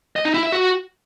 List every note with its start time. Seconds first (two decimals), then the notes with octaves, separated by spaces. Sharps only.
0.16 D#5
0.25 D#4
0.34 E4
0.43 E5
0.52 F#4